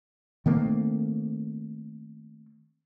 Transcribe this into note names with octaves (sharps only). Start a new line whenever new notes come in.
D#3 A3 A#3 C4